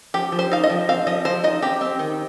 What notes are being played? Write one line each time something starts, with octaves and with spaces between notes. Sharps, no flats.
F3 G4
F3
C5
D#4 F5
D#5
F3
C4 F5
F3 D#5
F3 C5
D#4 D#5
C4 G4
C4
D#3